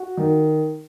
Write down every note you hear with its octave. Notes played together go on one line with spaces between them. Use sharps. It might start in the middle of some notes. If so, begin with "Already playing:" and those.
Already playing: F#4
D#3